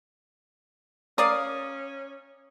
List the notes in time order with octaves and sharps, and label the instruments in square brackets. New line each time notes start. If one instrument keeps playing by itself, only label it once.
[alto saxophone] C#4 [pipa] A#4 D5 F5 [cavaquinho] D#6